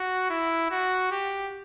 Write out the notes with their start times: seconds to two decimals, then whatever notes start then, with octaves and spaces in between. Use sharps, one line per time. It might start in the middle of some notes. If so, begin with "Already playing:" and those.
Already playing: F#4
0.30 E4
0.70 F#4
1.11 G4